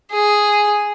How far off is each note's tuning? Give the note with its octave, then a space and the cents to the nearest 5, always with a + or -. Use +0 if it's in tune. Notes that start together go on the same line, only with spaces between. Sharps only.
G#4 +0